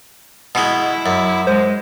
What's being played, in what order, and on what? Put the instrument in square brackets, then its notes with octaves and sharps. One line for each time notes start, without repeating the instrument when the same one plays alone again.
[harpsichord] B2 G#3 [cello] E4
[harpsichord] F#2
[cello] G#3 [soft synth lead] C5